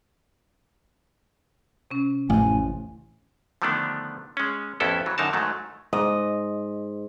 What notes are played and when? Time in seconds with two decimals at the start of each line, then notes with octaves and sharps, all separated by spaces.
1.91 C3 C#4
2.30 A1 F2 A2 G#5
3.62 D3 D#3 F3 A3 B3 D4
4.37 G#3 C#4
4.80 A1 F2 B3 C#4 E4 A4
5.06 E3 F#3
5.18 F#2 D3 D#3 D#4 A#4 A5
5.33 G#2 D#3 F#3 A3
5.93 G#2 D#5